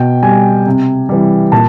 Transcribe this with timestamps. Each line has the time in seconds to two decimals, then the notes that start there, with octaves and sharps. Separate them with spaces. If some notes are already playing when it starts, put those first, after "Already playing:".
Already playing: B2 G5
0.23 G3 G#5
0.66 C3
1.09 E3 G3
1.52 A#2 A5